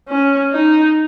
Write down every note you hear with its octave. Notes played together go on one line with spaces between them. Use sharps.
C#4
D#4